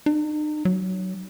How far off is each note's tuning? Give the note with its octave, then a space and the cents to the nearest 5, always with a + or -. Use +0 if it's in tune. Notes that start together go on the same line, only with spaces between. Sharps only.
D#4 -45
F#3 +15